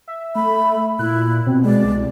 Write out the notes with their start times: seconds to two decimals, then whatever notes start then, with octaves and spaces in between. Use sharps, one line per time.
0.08 E5
0.35 A3 B5
0.99 A#2 E4 F#6
1.47 B2 C4
1.65 G#3 D5
1.85 C2